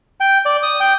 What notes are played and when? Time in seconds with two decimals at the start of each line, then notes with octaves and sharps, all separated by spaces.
0.20 G5
0.45 D5
0.63 D#6
0.80 G5